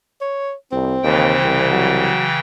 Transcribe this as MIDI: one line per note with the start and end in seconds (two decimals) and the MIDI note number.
0.21 0.53 73
0.72 0.97 36
0.72 1.69 60
1.03 1.35 39
1.03 2.40 49
1.03 2.40 52
1.03 2.40 79
1.41 2.13 36
1.70 2.30 54